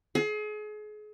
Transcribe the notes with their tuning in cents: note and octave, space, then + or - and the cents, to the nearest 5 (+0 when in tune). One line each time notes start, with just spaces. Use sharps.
G#4 +35